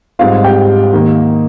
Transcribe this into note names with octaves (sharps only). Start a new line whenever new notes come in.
G#2 G3 C4 F4 F5
G4 G5
D#3 A#3